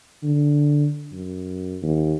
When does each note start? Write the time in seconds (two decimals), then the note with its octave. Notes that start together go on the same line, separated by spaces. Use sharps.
0.23 D3
1.12 F#2
1.83 D#2